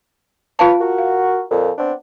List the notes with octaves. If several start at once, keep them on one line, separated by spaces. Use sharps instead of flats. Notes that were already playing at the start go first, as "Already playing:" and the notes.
F4 B4 C#5 F5 A5
F#4 A#4
F5
F2 A#2
B3 C4 D4